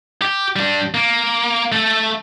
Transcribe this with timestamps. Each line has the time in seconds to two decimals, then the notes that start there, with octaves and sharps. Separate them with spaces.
0.22 G4
0.56 G3 D4
0.94 A#3
1.72 A3 A4